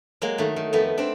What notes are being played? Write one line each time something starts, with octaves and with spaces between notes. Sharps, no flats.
F#3 G#3 A#3
D#3 A3
D#3
F2 A3 B3
C4 D4